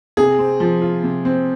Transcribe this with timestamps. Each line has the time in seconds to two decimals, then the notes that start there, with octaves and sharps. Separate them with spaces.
0.17 C3 G#4
0.39 C4
0.60 F3
0.82 F4
1.03 C3
1.25 C4